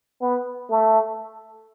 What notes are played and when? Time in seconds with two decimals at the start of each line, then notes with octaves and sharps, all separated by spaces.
0.22 B3
0.70 A3